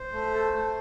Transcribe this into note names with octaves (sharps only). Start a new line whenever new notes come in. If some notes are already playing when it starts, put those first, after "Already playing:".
Already playing: C5
A3
A4
A3